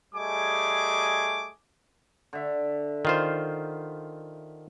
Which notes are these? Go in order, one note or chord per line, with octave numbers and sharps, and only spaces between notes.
G3 A3 G#4 D#5 G#5 D6
D3 E5
D#3 F4 C5